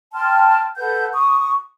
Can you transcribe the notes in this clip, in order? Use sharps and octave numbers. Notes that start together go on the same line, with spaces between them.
G5 A5 C6 F6
A4 B4 F#5 G6
C#6 D#6